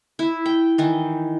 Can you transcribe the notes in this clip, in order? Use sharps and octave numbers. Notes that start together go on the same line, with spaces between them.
E4
G5
D#3 E3